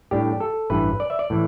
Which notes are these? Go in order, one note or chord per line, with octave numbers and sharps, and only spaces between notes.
A2 G3 D4 G4
A4
A1 G2 E3 B4
D5
E5
D5
A2 E3